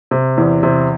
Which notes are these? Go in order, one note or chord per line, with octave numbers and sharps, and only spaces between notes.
C3
E2
C3